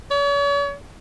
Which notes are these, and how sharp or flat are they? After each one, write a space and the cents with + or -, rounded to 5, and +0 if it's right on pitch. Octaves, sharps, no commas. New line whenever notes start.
C#5 +40